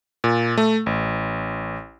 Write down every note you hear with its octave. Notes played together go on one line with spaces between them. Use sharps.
A#2
A3
A1